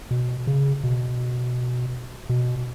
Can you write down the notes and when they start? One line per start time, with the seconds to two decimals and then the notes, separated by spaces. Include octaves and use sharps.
0.11 B2
0.47 C#3
0.84 B2
2.30 B2